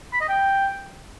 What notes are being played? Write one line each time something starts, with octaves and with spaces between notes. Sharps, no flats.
B5
D#5
G5